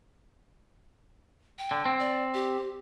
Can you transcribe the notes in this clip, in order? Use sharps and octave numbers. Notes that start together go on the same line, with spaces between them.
G5
D3
C4
D5
G4